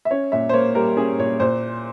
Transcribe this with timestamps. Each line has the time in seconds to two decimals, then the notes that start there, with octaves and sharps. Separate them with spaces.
0.05 E5
0.11 C#4 C#5
0.32 A#2 E5
0.49 C5
0.53 A#3 C#5
0.75 G3 A#4
0.97 C#4 G#4
1.19 A#2 C#5
1.40 A#2 C5